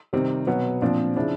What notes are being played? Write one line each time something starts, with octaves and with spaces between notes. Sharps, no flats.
C3 D#3 G3 C4
B2 F#3 B3
A#2 F3 C4 D4
C#3 F3 D4 E4